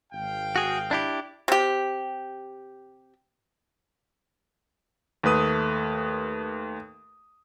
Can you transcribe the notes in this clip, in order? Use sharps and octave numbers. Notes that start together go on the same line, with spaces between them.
G#1 F5 G5
F#4 G#4
D4 E4 G4
C3 G4
D#2 A3 B4 D#6 D#7